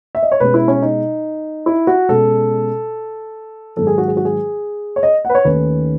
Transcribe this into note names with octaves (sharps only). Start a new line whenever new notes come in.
E5
D#5
C#5
B2 G#3 C#4 B4
E4
C#4
D#4
E4
F#4
B2 G#3 C#4 A4
G#2 D#3 F#3 A4
G#4
F#4
G#4
F#4
G#4
C#5
D#5
B4 F#5
C#5
D#2 D#3 A3 C#4 B4